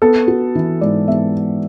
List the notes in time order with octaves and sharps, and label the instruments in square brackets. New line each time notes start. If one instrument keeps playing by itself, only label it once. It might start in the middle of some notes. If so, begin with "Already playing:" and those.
[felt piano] B3 [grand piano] A4
[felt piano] F#4
E3
[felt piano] G#2 [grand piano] D5
[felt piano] B3 [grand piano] E5